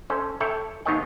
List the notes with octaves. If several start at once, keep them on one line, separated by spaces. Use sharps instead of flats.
C#4 A4 C5
A4 C#5 E5 G5
D#2 D#3 B3 C#5 D#5 G5